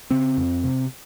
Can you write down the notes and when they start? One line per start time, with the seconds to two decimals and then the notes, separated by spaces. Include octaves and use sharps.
0.11 C#3 C4
0.38 F2
0.64 C3